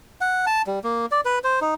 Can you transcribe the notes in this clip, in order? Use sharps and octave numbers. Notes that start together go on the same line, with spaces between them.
F#5
A5
G3
A#3
D5
B4
C5
D#4